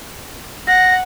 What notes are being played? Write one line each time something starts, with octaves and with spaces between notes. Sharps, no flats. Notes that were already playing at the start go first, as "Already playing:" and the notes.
F#5 A#6